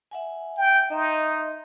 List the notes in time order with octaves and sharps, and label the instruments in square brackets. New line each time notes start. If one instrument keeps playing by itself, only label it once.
[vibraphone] E5 F#5 G#5
[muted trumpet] G5
[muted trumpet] D#4 [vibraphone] D#5 E5 C6